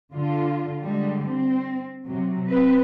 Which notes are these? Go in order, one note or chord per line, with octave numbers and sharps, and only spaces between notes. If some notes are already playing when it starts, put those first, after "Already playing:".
D3 F4
D3 G3 G#3
C4
C3 F#3
C4 B4